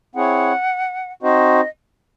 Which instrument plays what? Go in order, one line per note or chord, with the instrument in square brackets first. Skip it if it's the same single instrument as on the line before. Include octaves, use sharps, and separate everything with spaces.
[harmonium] C4 E4 G#4 C#5 [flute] F#5
[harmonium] C4 D#4 F#4 C5 [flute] D#5